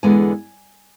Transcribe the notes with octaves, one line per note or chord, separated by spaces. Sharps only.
E2 D3 G#3 B3 G#5